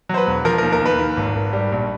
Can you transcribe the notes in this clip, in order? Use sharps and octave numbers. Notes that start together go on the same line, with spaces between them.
F#3 C5
B4
E1
F3 A#4
D#2 A#4
A#4
D#2 B4
D#3
G#1
G#1
G3
A#1